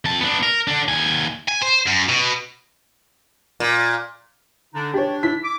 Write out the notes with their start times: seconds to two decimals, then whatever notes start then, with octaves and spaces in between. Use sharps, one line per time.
0.05 F2 A5
0.21 B3 D4
0.43 A#4
0.68 D3 D4
0.88 D#2 G#5
1.48 G#5
1.63 C5
1.87 F#2
2.09 B2
3.60 A#2
4.74 D3 D4 D#4
4.94 D4 G4 C#5
5.23 E4 B6
5.44 D6